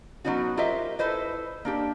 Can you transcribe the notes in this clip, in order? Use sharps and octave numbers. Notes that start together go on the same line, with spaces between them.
F#3 B3 C#4 D#4 F#4
F4 G4 A#4 C5 D#5 E5
E4 A4 B4 C5 D#5
A#3 D4 G4